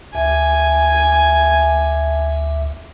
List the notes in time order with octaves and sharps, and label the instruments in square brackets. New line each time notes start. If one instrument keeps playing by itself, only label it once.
[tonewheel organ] D2 E5 [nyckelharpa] G#5